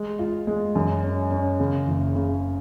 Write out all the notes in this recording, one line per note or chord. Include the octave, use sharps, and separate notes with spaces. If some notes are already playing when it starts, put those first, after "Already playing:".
Already playing: G#3
F4
G#3
F#2
C#4
C#4
C#3
F#1
C#3